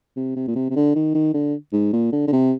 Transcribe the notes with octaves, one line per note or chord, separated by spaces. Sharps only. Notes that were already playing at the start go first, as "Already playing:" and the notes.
C3
C3
A#2
C3
C3
D3
D#3
D#3
D3
G#2
A#2
D3
D3
C3